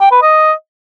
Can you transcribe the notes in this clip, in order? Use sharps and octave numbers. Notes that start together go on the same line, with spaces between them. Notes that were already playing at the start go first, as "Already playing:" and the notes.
G5
B4
D#5